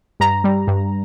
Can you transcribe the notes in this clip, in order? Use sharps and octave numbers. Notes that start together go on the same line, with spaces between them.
G2 A#5
G3
G2